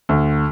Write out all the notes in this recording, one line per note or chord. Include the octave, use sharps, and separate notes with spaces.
D2